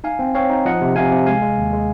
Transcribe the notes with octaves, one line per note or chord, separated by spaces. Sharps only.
D#4 F5 G#5
C4
C4 C#5 F5
D#4
F3 D#5 F#5
C3
C3 F5 G#5
C3
G#3 F5 G#5
G#3
D#2
G#3